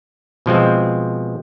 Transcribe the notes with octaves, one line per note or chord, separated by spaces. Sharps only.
B2 F3 G#3 C4